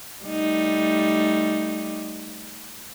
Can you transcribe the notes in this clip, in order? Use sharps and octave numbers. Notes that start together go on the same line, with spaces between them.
G3 A3 D#4